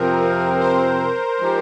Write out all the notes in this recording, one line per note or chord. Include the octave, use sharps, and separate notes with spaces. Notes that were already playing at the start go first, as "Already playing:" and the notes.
Already playing: F2 C3 F3 C4 A#4
C5
F3 G#3 D#4 G4